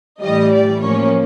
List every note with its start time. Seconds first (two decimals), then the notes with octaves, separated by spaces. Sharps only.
0.22 A2 E3 G3 D#5
0.53 D5
0.81 A2 F3 A#3 C#4 C#5